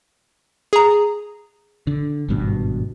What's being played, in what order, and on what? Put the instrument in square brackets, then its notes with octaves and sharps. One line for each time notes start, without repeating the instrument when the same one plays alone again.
[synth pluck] G#4 A#5
[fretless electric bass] D3
G#1 G2 B2